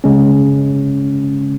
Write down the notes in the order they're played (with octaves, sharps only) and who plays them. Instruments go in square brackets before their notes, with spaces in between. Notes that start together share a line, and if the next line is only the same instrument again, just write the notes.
[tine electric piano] C#3 G#3 C#4